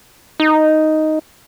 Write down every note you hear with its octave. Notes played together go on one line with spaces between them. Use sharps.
D#4